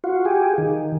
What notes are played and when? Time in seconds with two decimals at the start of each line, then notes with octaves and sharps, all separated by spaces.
0.04 F4 F#4
0.25 G4 G#4
0.58 D#3